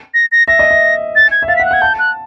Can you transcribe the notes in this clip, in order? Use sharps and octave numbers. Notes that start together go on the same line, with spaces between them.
A#6
A#6
E5 A#6
D#5
E5
A6
G#6
E5
F5 A6
B6
F#5
F#6
F#5 G#6
A5 G6
F#6